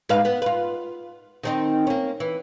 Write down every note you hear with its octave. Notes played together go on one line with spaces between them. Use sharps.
G#2 B4 F5
B3
F4 B4
D#3 C4 D#4
A#3 C#4
E3